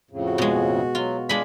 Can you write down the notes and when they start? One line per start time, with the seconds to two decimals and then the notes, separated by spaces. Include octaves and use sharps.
0.11 F2 A2 C#3
0.27 F#4
0.38 B2 G#3
0.95 F#3 F4
1.29 G#3 D4 F4 D5 B5